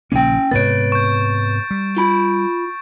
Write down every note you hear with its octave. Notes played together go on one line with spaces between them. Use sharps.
A#1 C#3 A#3 C#4 G5
G#2 C3 B3 B4 C#5 A6 D7
C#6 G6
G3
F4 B5